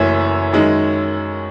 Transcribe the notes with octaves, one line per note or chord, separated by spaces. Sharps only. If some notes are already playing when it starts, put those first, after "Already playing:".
Already playing: F#1 F#2 E3 A3 C#5 E5
F#2 D#3 G#3 D#4